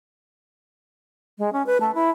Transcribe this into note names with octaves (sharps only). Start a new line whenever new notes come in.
G#3
C#4
B4
A3
E4